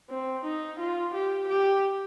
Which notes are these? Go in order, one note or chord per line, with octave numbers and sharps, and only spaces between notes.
C4
D#4
F4
G4
G4